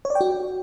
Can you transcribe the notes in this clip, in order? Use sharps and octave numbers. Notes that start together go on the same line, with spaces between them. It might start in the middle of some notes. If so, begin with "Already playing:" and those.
C#5
D5
G5
F#4